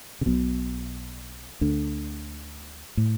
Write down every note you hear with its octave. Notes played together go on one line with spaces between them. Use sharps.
C#3
B1 B2
D2 D3
A2